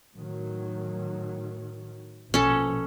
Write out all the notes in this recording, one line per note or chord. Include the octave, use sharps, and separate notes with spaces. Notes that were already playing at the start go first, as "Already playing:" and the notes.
A2 D#3 F#3
A#1 B2 F3 C#4 A4